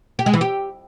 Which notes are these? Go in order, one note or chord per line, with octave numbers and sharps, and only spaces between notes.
G4
G#3
E3
G4